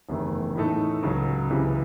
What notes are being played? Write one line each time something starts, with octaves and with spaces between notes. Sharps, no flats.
F#1 E2 C3 D#3 A3
A2 E3 A3 D#4 A4
C#2 C#3 F#3
C#2 C3 E3